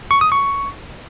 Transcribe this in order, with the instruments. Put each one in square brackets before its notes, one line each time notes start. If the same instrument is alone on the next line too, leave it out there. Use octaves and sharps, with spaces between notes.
[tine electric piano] C#6
D#6
C#6